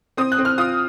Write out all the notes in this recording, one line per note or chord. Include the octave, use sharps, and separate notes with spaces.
C4 D#6
F#6
C4
F6
F4 D#6